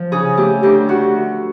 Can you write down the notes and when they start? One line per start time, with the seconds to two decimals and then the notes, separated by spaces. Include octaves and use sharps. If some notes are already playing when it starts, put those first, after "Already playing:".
Already playing: F3
0.12 C#3 G#4
0.37 A3 G4
0.63 D2 G4
0.88 D2 F#4